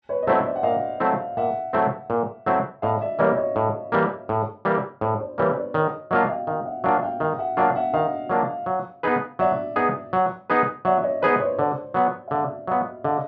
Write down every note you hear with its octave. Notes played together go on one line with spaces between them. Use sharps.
B4 C#5
D#5
F#3 A3 C4 E4 C5 D5
D5 E5
F#5
A#2 D#5 F5
F#3 A3 C4 E4
A#2 E5 F#5
F#3 A3 C4 E4
A#2
F#3 A3 C4 E4
A2 D#5 F5
D5 E5
E3 G3 A#3 C#5 D#5
C#5 D#5
A2
E3 G3 A#3
A2
E3 G3 A#3
A2 C5 D5
C5 D5
E3 G3 A#3 B4 C#5
C5 D5
D#3 C#5 D#5
F#3 A#3 D4 F4 D#5 F5
F5 G5
D#3 F5 G5
E5 F#5
F#3 A#3 D4 F4 F5 G5
F5 G5
D#3 F5 G5
E5 F#5
F#3 A#3 D4 F4 F5 G5
E5 F#5
D#3 D#5 F5
F#3 A#3 D4 F4
F#3
B3 D#4 G#4 B4
F#3 D5 E5
B3 D#4 G#4 B4
F#3
B3 D#4 G#4 B4
F#3 D5 E5
C#5 D#5
B3 D#4 G#4 B4 C5 D5
B4 C#5
D3 C5 D5
F#3 B3
F5
D3 D5 E5
F#3 B3 D#5 F5
D3 D#5 F5